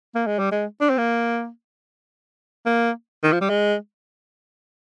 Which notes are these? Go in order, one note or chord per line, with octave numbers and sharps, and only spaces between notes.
A#3
G#3
G3
G#3
D4
C4
A#3
A#3
D#3
F3
G3
G#3